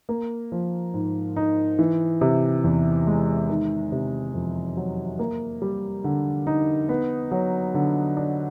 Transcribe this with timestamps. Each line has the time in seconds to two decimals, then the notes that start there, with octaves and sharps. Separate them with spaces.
0.09 A#3
0.52 F3
0.94 G#2
1.36 D#4
1.79 E3
2.21 C3
2.64 E2
3.07 G#3
3.49 D#3
3.92 C3
4.34 F2
4.77 F#3
5.19 A#3
5.62 G3
6.04 D3
6.47 D#4
6.89 B3
7.31 F#3
7.74 D3
8.17 D4